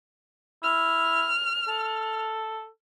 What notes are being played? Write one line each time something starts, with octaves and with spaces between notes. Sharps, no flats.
E4 F6
A4